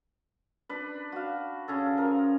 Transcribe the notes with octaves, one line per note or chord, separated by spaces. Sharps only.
D4 B4
F#4 F5
C#3 C#4 A4
F3 A#4